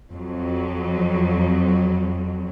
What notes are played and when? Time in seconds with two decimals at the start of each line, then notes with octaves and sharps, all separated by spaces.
0.12 F2 F#3